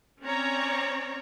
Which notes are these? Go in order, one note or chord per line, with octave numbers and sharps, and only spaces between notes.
C4 C#4 C#5 D5 A#5